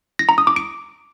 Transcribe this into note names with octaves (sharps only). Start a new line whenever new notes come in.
A#6
A#5
D#6
D6
D7